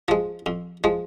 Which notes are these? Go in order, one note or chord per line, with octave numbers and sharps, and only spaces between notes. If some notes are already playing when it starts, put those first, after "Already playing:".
F3 G#3
F2
F3 G#3